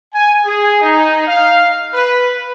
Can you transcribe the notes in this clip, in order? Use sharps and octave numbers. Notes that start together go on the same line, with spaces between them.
G#5
G#4
D#4
F5
B4